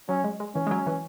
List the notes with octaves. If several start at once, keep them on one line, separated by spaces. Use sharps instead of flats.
F#3 C#4
G#3
G#3
E3 C#4
G#3
F#3
E3